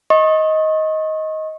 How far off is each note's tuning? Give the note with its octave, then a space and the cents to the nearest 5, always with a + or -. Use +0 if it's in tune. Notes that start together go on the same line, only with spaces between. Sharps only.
D#5 +15 C#6 -35